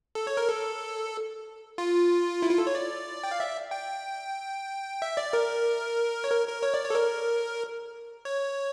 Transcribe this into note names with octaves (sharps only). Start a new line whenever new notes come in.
A4
C#5
A#4
A4
F4
E4
F4
A4
C#5
D5
G5
F5
E5
G5
E5
D5
A#4
C#5
A#4
A#4
C#5
D5
C#5
A4
A#4
C#5